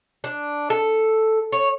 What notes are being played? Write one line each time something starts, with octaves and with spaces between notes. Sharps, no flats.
D4
A4
C#5